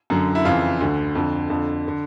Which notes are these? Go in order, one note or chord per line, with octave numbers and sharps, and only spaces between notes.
F#2 D3
E4
F2 C#3 E3 F4
D2 D3
F2 D3
F2 D3
D3